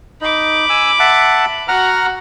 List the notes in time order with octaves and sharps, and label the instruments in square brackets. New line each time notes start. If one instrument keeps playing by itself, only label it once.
[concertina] D#4 [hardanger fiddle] B5 D6
[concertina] G#5 E6
E5 F#5 A5
[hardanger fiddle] F#4 [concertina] F#5 A#5 F6